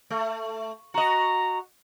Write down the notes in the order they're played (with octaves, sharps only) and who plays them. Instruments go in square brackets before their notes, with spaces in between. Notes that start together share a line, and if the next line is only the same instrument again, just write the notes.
[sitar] A3
[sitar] F#4 D#5 [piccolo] A#5